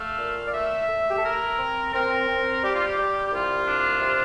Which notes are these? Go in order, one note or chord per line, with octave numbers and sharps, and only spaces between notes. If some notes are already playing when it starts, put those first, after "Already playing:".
Already playing: A3 F5
A#2
D5
A3 E5
A3
G4
A4
E4 A#4
C4
C4 A#4
C4
G3 G4
F4
G4
G3
G4
C2 F4
D4
C3